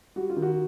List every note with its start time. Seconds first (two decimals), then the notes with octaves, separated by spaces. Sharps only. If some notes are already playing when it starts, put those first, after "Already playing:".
0.16 G3 F#4
0.30 F4
0.36 D#3
0.42 F#4